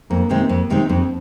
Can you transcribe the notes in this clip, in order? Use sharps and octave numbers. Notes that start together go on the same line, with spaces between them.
F2 A#3
C3 D#3 G#3 C4
F2
C3 D#3 G#3 C4
F2 C4